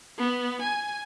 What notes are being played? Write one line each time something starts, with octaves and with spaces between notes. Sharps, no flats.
B3
G#5